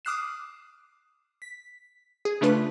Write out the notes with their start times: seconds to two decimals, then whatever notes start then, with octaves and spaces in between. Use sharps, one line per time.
0.05 D6 D#6 F6 F#6 C7 E7
1.42 B6
2.25 G#4
2.41 C#3 A3 D4 F4 B4 F#6